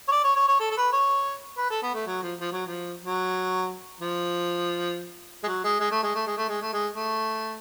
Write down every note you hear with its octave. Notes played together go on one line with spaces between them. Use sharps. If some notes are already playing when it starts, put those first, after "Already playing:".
C#5
D5
C#5
C#5
C#5
A4
A4
B4
C#5
B4
A4
B3
A3
F#3
F3
F3
F#3
F3
F#3
F3
G#3
F#3
G#3
G#3
A3
G#3
A3
G#3
A3
G#3
A3
G#3
A3